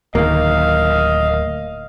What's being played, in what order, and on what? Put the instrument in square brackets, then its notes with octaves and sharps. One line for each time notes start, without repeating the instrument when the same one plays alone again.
[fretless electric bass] D1 D2 D#3 [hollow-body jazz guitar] A#3 [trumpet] D#5 [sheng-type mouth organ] F5